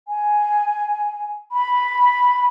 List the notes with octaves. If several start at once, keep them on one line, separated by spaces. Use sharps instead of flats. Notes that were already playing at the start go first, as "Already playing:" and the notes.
G#5
B5